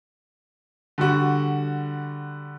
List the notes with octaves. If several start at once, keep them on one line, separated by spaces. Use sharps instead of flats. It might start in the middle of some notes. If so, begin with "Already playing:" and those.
D3 G3 F#4